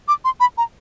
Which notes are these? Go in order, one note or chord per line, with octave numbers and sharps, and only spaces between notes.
D6
C6
B5
A#5